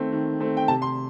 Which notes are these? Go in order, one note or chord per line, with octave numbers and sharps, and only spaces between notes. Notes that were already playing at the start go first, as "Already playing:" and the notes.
Already playing: D#3 A3 C4
D#3
A3 C4
G5
C3 A5
C6